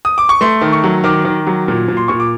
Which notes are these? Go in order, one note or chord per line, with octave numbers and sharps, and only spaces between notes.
D#6
D6
C#6
A3 C6
D#3
C#6
F#3
D#3 D6
D#3
F#3
A#2
A#2
C6
A#2 C#6
D6